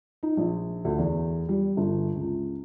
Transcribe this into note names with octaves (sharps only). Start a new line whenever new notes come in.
D#4
A#1
D2
E2
G3
G1
C#2